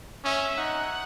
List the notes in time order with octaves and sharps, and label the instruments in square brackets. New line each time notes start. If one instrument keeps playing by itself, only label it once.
[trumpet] C#4 [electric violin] E5
[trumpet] D#4 [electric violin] F#5